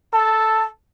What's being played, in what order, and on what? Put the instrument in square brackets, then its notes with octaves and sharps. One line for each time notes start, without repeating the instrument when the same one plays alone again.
[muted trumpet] A4 [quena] A5